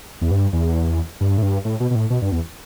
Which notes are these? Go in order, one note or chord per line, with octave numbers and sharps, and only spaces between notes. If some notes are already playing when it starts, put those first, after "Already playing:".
E2
G2
E2
G2
A2
G2
A2
B2
B2
A2
B2
G2
E2